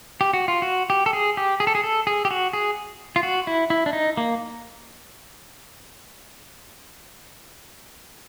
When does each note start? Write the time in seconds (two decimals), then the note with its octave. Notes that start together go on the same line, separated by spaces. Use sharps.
0.21 G4
0.33 F#4
0.48 F4
0.62 F#4
0.90 G4
1.06 A4
1.13 G#4
1.37 G4
1.60 G#4
1.67 A4
1.75 G#4
1.84 A4
2.07 G#4
2.25 G4
2.31 F#4
2.53 G#4
3.16 F4
3.23 F#4
3.47 E4
3.70 E4
3.86 D4
3.93 D#4
4.17 A#3